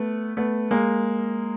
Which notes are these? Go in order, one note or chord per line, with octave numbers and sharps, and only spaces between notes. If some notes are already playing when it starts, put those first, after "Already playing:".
Already playing: A3 B3
A3 B3
G#3 A#3